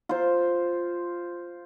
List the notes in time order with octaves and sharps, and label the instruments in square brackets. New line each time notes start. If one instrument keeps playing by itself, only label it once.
[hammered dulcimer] F4 C5